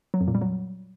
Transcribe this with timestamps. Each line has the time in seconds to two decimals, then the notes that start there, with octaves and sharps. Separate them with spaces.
0.14 F#3
0.21 F2
0.28 A#2
0.35 G3
0.42 F#3